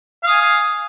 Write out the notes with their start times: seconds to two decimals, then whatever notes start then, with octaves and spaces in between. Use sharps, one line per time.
0.23 F5
0.27 D#6
0.31 G#5